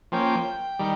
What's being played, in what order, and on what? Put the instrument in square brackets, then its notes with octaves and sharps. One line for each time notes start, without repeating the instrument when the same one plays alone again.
[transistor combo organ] F3 A#3 C#4 [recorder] G5
[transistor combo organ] D#3 G3